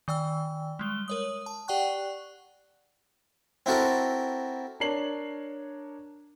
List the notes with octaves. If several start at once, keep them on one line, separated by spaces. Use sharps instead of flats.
D#3 D5 G5 E6
G3 G#3 G7
A#4 C#5 D#6
A5
G4 D5 F#5 G5 C#6 F#6
C4 E4 F#4 A4 A#4
D4 A#4 C#5 C7 F#7